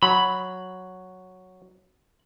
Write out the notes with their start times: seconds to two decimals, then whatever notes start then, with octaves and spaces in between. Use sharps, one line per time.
0.03 F#3 B5